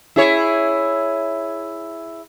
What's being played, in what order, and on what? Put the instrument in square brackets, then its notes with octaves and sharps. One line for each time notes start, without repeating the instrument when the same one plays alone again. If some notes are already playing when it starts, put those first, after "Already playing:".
[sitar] E4 G#4 C#5